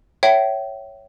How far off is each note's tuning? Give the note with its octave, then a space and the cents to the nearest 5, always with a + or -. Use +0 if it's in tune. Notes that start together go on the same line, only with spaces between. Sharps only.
C#5 +0 E5 +10 G5 -35